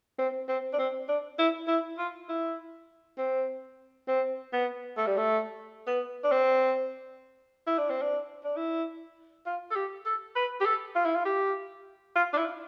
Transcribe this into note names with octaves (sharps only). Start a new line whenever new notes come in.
C4
C4
D4
C4
D4
E4
E4
F4
E4
C4
C4
B3
A3
G3
A3
B3
D4
C4
E4
D4
C4
D4
D4
E4
F4
A4
G4
A4
B4
G4
A4
F4
E4
F4
G4
F4
D4
E4